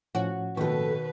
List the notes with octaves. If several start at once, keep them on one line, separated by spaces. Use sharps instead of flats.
A2 F3 C#4 F#4
D#2 B2 D#3 A3 B4